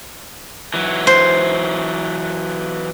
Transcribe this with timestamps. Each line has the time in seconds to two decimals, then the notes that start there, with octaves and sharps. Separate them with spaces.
0.74 E3 F#3
1.07 C5